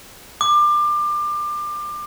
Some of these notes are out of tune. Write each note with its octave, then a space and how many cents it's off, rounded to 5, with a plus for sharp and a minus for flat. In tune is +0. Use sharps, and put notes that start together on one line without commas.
D6 +25